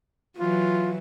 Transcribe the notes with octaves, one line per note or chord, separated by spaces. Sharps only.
E3 F#3 F4